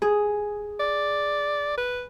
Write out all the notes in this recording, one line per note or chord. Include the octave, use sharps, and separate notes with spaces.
G#4
D5
B4